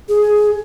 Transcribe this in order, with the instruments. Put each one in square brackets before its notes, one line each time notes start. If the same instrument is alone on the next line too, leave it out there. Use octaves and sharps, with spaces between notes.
[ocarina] G#4